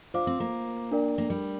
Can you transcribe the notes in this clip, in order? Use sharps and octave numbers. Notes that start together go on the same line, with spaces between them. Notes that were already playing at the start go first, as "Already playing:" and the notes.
D4 F4 C5 F5 D6
C4
A#3
D4 A#4 D5 G5
A#3
G3